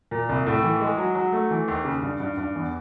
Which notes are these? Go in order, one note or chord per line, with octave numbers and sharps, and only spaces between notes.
A#2
C2
A2
E3
G#3
F#3
F#3
A3
E3
D#2
C#3
G2
G2
G2
E2